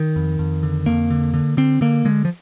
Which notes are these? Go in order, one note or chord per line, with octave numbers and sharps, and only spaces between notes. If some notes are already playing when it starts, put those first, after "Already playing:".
Already playing: D#3
F2
F2
D3
F2 A#3
D3
D3
D3 C4
D3 A#3
D3 G#3
F3